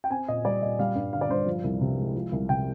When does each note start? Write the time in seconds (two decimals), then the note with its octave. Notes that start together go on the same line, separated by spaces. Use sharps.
0.04 G5
0.11 C4 G#5
0.28 A#2 D#5
0.45 G3 D5
0.62 A#2 D#5
0.79 G3 F5
0.95 G2
1.13 D3 F5
1.21 D5
1.29 G2 C5
1.46 F3
1.64 C2
1.81 C3
1.98 G#3
2.14 F3
2.32 C2
2.49 C3 G5